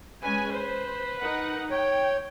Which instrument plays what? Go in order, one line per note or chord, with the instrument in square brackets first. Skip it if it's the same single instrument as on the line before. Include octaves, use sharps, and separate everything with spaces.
[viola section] G#3 C#4 G#5 [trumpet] B4
[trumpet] B4 [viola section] C5
[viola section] D#4 A#4 F#5
[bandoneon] C#5 [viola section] G5